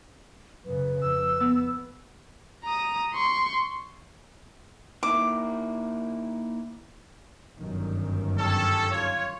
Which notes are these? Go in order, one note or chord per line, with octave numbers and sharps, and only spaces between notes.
F#2 C#3 B4
F2 E6
B3
A#5 D#6
C6 C#6
D#3 A#3 E4 D6
G1 F#2 D#3
C#4 G4 A4
F4 C#5